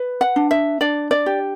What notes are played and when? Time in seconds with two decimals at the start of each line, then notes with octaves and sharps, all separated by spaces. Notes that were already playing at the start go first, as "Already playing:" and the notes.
Already playing: B4
0.21 F#5
0.36 D4
0.51 E5
0.81 D4 D5
1.11 D5
1.26 G4